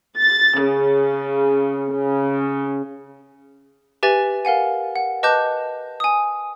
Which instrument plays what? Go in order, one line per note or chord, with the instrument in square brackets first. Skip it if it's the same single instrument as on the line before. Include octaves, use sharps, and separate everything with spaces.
[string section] A6
C#3
C#3
[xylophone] G4 B4 E5 G#5 A6 F7
A#4 F5 F#5 G#5
F#5
B4 D#5 A5 D6 F#6 G6
G#5 D#6